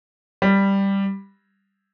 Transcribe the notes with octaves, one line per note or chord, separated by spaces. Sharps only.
G3